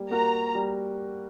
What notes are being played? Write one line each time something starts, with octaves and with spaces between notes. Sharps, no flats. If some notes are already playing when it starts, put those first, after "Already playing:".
Already playing: G3 A#3
A#3 F#4 A#4 A#5
G3